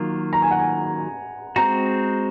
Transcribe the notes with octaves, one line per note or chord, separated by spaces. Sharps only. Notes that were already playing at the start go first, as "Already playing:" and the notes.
Already playing: D#3 F#3 A#3 F4
A#5
G#5
F#5
G#5
G#3 C4 F#4 A#5